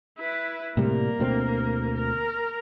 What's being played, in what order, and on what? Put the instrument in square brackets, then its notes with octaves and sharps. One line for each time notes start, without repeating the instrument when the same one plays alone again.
[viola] E4 B4
[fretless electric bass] A2 C3 G3 [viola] A#3 A#4
[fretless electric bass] D2 B2 C4
[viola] A#4